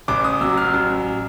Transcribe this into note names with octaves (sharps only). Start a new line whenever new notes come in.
A1 D6
D#6
F#3 E6
F6
A1